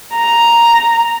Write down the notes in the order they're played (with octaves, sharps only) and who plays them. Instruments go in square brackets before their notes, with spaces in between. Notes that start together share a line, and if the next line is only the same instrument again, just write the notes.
[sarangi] A#5